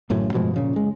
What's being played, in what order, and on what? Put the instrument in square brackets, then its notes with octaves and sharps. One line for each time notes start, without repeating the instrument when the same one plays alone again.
[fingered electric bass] A1 F#2 A2 C#3
G2 B2 F3 G#3
A#2 C#3 F3
F#1 G#3